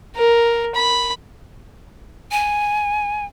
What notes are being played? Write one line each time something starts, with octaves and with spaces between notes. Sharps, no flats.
A#4
B5
G#5